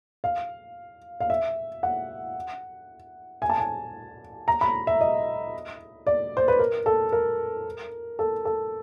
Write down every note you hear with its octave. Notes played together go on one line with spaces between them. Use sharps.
F5
F5
E5
F#5
G#5
A5
G#5
A#5
B5
E5
D#5
D5
C5
B4
A#4
A4
A#4
A4
A4